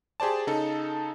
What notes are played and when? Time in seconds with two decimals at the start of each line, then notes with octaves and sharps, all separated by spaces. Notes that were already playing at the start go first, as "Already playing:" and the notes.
0.20 G4 G#4 C5 D5 A5
0.47 C#3 D#4 A4